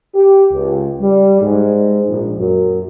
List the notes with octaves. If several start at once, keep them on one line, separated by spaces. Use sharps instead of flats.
G4
C#2
G3
G#2
A#1
F#2